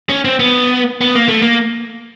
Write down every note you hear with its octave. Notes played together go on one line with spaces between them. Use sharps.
C#4
C4
B3
B3
A#3
A3
A#3